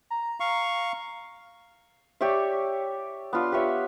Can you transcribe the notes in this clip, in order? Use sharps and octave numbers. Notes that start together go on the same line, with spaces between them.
A#5
F5 C#6
G4 C#5 D5 E5
B3 D4 F4
G4 B4 C#5 E5